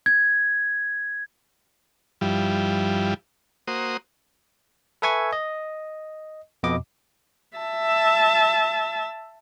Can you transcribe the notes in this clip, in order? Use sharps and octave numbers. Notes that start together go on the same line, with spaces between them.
G#6
G2 F3 G3 E4
A#3 F#4 C5 D#6
A4 B4 E5 G#5 C#6 G#6
D#5
F2 B2 D#5 D6
E5 A5